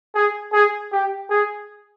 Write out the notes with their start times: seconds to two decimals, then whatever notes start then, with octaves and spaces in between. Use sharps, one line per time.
0.15 G#4
0.53 G#4
0.92 G4
1.30 G#4